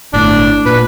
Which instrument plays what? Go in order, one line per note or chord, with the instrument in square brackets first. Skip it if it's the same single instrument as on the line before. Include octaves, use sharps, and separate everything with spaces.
[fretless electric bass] G1 A2 [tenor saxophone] D4
[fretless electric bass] A#2 [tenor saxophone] B4